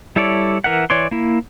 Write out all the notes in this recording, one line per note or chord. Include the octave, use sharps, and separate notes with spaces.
G3 E4 A4 C#5 D5
E3 A#4 E5 F#5
E3 C#5 D5 C6
A#3 E4